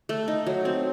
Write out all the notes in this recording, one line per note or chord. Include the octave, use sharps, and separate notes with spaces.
A3
D#4
F#3
C4